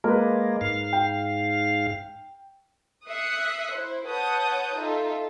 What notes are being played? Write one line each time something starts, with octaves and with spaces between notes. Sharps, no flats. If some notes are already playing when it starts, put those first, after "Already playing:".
G#3 A#3 A#4 B4
G#2 F5
G5
E5 D#6 F#6 C7 C#7
E4 C5
B4 C#5 F#5 A5 D#6 G6
D#4 F4 A4 E5